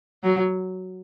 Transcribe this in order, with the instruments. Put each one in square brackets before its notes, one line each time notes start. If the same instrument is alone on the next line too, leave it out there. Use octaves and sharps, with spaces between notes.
[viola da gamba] F#3